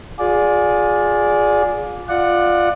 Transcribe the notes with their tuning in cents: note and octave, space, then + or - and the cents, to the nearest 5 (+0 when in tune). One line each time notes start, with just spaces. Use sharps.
F4 +35 G#4 +0 D5 -10
F4 +0 D5 +20 F#5 -5